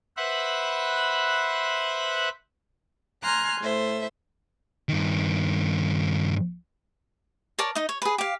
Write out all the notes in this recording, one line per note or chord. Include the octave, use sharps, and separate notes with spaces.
B4 C5 E5 F#5 B5 F#6
G#5 A#5 C6 F6 F#6
A2 C5 E5
G2 D#3
A#4 C#5 D5 A5
D#4 D#5
C#5
G#4 B4
G4 F5